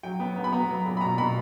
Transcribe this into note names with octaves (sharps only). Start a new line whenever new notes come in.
F#3 G5
B3
B3
B5
B3 A#5
F#3
A#2
B5
B2 A#5
B2 B5